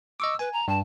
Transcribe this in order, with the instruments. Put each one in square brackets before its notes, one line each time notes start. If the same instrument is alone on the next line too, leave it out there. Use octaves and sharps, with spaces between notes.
[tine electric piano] D#5 C#6 D6 [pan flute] E6
[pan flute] B4 [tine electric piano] G#5
[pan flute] A#5
[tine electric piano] G2 [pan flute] A5